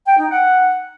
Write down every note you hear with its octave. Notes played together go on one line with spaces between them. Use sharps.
G5
D#4
F#5